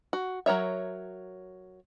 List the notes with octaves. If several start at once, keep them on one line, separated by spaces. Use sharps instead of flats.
F#4
F#3 A#4 C#5 E5